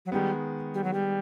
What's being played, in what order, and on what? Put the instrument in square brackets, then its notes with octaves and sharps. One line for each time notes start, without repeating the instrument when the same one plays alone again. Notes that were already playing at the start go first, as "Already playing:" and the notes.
[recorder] F#3
[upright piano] D#3 G#3 B3 [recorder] G3
[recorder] G3
F#3
G3